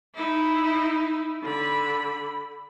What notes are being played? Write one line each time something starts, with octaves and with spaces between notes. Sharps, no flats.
D#4 E4
D3 B5